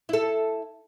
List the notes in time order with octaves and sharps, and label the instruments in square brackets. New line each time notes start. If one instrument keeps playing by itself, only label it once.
[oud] E4 A4